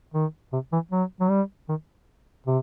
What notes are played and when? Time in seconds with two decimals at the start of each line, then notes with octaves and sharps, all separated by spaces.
0.14 D#3
0.53 C3
0.72 E3
0.92 F#3
1.21 F#3
1.30 G3
1.69 D#3
2.47 C3